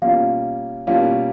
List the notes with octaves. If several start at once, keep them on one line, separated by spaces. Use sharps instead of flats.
B2 G3 A#3 C#4 F4 F5
B2 G3 A#3 C#4 F4 F5